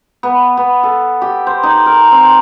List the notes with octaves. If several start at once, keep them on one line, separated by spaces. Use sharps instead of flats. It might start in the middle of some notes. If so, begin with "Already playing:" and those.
B3
B3
A4
G4
C5
D#4
A#4
C4